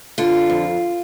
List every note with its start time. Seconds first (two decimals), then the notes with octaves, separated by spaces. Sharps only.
0.18 D3 F4
0.50 F2